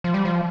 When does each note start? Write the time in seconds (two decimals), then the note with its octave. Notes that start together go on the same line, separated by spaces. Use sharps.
0.04 F3
0.14 G3
0.25 F3